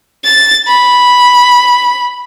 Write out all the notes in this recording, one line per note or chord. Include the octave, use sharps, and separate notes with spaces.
A6
B5